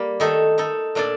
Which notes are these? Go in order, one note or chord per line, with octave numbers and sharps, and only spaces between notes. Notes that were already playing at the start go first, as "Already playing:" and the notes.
Already playing: G3 A#3
D#3 A3 D#4 A4
A3 D#4 A4
A#2 A3 D4 A4 D5